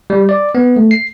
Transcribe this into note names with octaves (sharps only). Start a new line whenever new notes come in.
G3
D5
B3
A3
C7